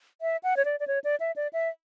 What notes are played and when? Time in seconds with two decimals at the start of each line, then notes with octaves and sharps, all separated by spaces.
0.21 E5
0.43 F#5
0.57 C#5
0.65 D5
0.80 D5
0.87 C#5
1.04 D5
1.20 E5
1.36 D5
1.53 E5